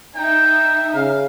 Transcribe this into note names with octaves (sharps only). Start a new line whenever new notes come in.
D#4 E5 G5
C#3 F5